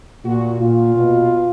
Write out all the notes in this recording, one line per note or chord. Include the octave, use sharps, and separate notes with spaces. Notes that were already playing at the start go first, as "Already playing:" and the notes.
A#2 F#4
A#2 F4
B2